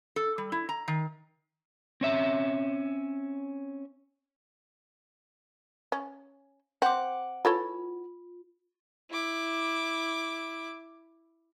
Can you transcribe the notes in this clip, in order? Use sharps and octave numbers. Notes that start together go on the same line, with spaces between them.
A4
G3
E4
A#5
D#3
C4 C#4 E5
C#4
C4 F#5 D6
E3 F4 A4 C#5
E4 D6